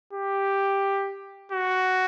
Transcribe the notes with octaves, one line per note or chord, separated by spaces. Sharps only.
G4
F#4